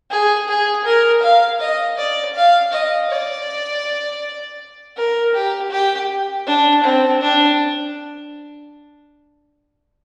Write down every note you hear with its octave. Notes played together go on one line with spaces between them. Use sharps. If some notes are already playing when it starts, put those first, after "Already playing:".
G#4
G#4
A#4
F5
D#5
D5
F5
D#5
D5
A#4
G4
G4
D4
C4
D4